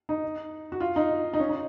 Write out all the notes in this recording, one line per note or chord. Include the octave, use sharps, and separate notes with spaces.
D#4
F#4
F4
D#4
D#4
C#4
D#4